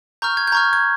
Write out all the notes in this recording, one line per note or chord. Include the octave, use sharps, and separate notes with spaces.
A#5 C#6 F6 G6
G#6
G6
A#5 C#6 F6 G#6
G#6